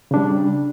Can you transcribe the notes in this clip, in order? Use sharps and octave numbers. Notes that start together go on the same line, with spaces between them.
C#3 G3 D4